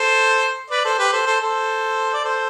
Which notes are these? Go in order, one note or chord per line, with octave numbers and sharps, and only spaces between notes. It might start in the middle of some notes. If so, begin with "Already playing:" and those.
Already playing: A4 C5
B4 D5
A4 C5
G4 B4
A4 C5
A4 C5
A4 C5
D5
A4 C5